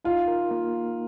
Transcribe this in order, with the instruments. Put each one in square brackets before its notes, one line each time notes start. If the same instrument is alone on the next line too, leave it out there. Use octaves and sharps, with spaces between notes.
[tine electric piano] D#4 [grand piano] F4
[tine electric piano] A#4
A#3